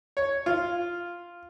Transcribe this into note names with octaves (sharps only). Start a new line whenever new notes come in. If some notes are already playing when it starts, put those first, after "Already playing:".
C#5
F4